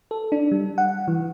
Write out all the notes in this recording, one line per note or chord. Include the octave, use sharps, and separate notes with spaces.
A4
D4
G3
F#5
E3